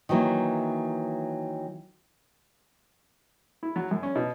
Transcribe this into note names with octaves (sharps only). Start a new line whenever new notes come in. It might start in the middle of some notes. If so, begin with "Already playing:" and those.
D#3 E3 F#3 A#3 E4
E4
F#3
F#2
C#4
B2